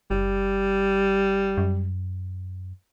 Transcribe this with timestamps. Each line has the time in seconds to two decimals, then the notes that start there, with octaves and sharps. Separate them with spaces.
0.11 F#1 G3
1.58 F#2